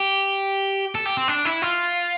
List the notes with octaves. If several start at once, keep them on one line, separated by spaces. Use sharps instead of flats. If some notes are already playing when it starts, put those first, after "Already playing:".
Already playing: G4
A4
G4
C4
D4
E4
F4